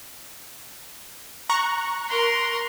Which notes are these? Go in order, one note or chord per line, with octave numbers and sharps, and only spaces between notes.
A#5 C#6 F#6
A#4 C6